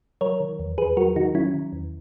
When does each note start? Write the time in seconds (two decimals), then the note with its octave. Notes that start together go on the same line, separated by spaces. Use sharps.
0.21 F#3 A#4 C#5
0.40 D#3
0.60 E2
0.78 E2 G#4 B4
0.97 F#3 F#4 A#4
1.16 D#3 D#4 F#4
1.35 F#3 C#4 E4
1.54 D#3
1.72 E2